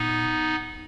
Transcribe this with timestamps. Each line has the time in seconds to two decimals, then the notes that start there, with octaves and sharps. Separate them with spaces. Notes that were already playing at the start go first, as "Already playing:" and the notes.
Already playing: A#2 B3 D#4